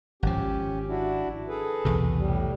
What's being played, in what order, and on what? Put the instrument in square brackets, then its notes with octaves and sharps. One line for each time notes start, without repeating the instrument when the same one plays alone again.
[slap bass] G#1 F3 [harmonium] C#4 G4
[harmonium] D4 E4 F#4
G#4 A4 B4
[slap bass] B1 E2 C3
[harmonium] A2 G3